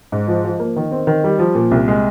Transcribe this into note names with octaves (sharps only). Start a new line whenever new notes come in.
G#2
F3
F3
A#3
D#3
C4
D#3
G3
F3
A#2
C2
G#3